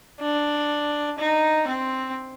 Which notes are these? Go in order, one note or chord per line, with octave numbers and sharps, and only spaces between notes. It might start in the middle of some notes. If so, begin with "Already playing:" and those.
D4
D#4
C4